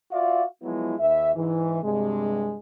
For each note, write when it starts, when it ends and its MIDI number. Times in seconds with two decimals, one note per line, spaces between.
0.12 0.44 65
0.12 0.44 66
0.12 0.44 74
0.12 0.44 76
0.12 0.44 77
0.63 0.96 53
0.63 0.96 54
0.63 0.96 56
0.63 0.96 59
0.63 0.96 64
1.00 1.31 39
1.00 1.31 76
1.36 1.83 44
1.36 1.83 52
1.84 2.57 43
1.84 2.57 48
1.84 2.57 56